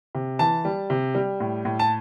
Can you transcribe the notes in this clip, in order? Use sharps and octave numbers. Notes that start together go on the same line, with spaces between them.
C3
E3 A5
G3
C3
G3
A2
A2
A5